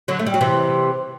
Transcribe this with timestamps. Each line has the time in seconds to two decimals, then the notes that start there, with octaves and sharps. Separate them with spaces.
0.08 D3 F#3
0.19 A3
0.26 G3
0.34 F#3
0.41 C3 E3